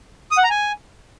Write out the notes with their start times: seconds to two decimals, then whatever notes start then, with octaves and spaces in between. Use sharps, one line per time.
0.31 D#6
0.38 F#5
0.44 A#5
0.50 G#5